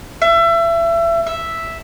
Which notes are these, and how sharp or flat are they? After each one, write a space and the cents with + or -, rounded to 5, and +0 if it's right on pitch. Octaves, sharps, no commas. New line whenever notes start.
E5 +30
E5 +0